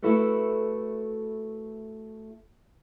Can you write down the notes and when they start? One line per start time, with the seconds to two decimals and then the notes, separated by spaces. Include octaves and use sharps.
0.02 A3 E4 F#4 A4 B4